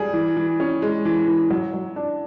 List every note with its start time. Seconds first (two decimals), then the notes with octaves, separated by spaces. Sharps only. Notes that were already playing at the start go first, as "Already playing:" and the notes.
Already playing: G3 G#4
0.13 E3
0.37 E3
0.60 C#4
0.82 G#3
1.05 E3
1.28 E3
1.50 F#3
1.74 F#3
1.96 D4